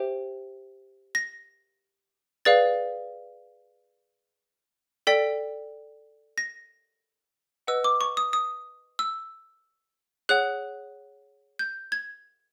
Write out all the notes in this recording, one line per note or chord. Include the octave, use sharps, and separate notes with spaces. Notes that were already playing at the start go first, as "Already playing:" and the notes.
Already playing: G4 C5 E5 G5
A#6
G#4 B4 D5 F5 A6
A4 D5 G5 B6
A#6
B4 D#5 F#5 E6
D6
C#6
D#6
D#6
E6
G#4 C#5 F#5 F#6
G6
G#6